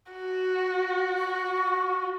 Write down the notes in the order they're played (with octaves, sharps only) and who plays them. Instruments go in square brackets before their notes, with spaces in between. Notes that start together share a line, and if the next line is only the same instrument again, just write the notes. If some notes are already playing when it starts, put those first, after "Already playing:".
[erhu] F#4
[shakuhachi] C#6